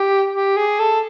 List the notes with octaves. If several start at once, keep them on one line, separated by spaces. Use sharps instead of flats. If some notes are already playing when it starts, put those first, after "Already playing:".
Already playing: G4
G4
G#4
A4